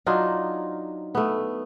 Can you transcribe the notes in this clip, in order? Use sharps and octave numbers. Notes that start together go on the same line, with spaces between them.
F#3 D4 D#4 F4
A3 B3